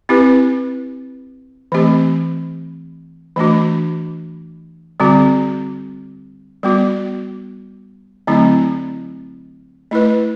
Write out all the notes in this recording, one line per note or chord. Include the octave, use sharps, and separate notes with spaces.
C4 E4 G4 B4
E3 A3 C4 G4
E3 A3 D4 F#4
D3 G3 C4 F#4
G3 B3 F#4
D3 F#3 A3 C4 E4
A3 E4 B4